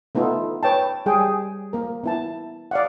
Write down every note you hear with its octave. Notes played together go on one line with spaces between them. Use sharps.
A3 B3 D#4 F4 A4
B4 C#5 G5 A5
G3 G#4 G5
A#3 A#4
B3 E4 A5
D5 F5 F#5